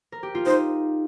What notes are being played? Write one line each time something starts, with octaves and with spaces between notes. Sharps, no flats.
A#4
G4
F4
D#4 C5